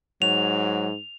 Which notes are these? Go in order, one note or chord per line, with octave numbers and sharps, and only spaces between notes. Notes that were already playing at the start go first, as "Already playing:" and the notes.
G#2 F#3 F7